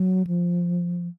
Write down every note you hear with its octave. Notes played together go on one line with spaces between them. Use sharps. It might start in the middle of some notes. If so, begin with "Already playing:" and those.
Already playing: F#3
F3